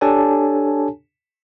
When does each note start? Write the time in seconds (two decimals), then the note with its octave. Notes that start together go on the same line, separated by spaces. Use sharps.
0.01 D4 G4 A4 C#5 G#5 A5